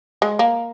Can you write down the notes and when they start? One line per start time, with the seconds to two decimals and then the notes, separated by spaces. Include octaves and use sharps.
0.22 G#3
0.39 A#3